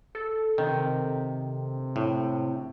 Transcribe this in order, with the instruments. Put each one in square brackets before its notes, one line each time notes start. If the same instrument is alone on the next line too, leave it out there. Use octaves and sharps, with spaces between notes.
[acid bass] A4
[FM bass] C3 [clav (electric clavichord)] D#3
[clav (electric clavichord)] A2